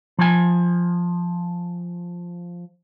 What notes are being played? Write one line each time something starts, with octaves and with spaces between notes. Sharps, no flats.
F3 G#5